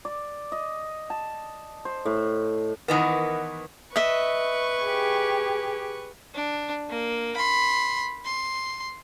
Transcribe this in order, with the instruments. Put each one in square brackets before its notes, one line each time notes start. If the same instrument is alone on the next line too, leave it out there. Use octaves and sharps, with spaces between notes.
[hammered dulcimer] D5
D#5
A5
C5
A2
[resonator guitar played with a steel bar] D#3 E3 B3 [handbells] A#4 D#5 F#5
[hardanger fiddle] B4 C#6 [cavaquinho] D#5 E5
[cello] G4 G#4
[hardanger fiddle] D4
A#3
B5 C6
C6